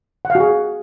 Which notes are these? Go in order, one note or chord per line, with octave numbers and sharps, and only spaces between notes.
F#5
F5
F#4
G#4